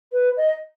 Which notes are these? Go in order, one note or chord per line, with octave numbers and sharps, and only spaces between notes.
B4
D#5